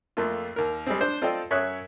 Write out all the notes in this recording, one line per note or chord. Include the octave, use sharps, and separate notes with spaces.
F2 A3 A#3 F4
D#2 A#4
G3 G#3 C4
D4 C5
C4 F4 A4 D5 D#5 G5
F#2 C#5 E5 D#6 F#6